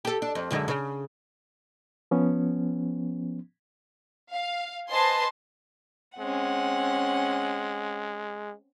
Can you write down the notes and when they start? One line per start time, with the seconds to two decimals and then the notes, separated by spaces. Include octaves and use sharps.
0.05 G4 A4
0.22 D4
0.35 F2
0.51 F#2 D3 G#3
0.68 C#3
2.11 F3 B3 C#4
4.31 F5
4.91 B4 C5 D#5 G#5 A5 C6
6.20 G#3 C4 C#4 F#5